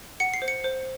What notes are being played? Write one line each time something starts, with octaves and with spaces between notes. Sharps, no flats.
F#5 C#7
C7
C5
C#7
C5